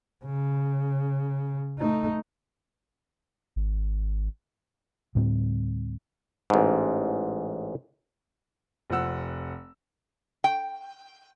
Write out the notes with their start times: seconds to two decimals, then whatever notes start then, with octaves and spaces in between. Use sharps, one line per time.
0.25 C#3
1.78 A3 D#4
3.56 G#1
5.15 D2 A2 G3 C4
6.50 A1 G#2
8.90 F1 F3 C4 F#5 E6
10.44 G5